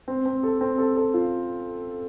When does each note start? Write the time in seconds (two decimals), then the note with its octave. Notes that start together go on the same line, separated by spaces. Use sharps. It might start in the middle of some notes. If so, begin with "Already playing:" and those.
0.08 C4
0.25 C4
0.43 A4
0.61 C4
0.78 A4
0.97 A4
1.14 F4